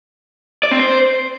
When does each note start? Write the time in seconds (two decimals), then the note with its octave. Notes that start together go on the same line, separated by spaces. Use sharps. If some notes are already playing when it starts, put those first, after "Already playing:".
0.63 D5
0.71 C4
0.79 C5